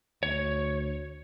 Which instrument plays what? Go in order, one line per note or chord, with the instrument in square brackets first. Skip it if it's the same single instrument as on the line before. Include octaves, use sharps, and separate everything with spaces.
[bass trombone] D2 [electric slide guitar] C#5